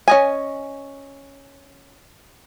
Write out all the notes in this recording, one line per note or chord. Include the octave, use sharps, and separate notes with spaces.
C#4 D#5 G#5